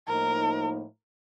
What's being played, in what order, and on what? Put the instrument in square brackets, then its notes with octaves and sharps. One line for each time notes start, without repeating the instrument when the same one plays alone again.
[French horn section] A2 F3 A#3 D#4 [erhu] A#4